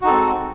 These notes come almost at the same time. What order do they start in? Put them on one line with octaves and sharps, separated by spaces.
F#4 D#4 A4 C4 G#3